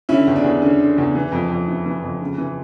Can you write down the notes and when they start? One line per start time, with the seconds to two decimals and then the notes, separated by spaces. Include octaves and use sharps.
0.09 D3 C#4 E4
0.27 E2
0.36 D4
0.44 E2
0.62 D3 C#4
0.80 D3
0.98 E2
1.15 E3
1.32 F2
1.50 F2
1.68 E3
1.86 E3
2.04 F2
2.21 C#3
2.38 E3